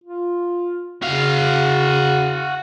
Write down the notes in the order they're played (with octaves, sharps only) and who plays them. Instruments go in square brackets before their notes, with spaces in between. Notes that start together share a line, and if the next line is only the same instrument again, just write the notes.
[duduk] F4
[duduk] C#3 [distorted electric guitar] F#4 F5